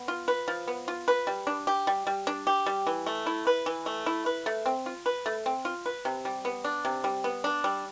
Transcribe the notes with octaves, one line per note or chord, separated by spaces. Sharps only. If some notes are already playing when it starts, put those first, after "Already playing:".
Already playing: B3
F4
B4
F3
B3
F4
B4
G3
D4
G4
G3
G3
D4
G4
G3
E3
A3
E4
B4
E3
A3
E4
B4
A3
C4
F4
B4
A3
C4
F4
B4
C3
G3
B3
D4
C3
G3
B3
D4
G3